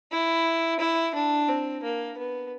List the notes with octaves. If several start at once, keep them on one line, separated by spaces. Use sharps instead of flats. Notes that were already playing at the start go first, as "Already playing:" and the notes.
E4
E4
D4
C4
A#3
B3